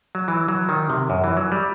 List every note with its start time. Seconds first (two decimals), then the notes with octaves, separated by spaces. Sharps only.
0.15 F#3
0.28 E3
0.48 F#3
0.69 D#3
0.90 C3
1.10 F#2
1.24 E3
1.37 F#3
1.52 G3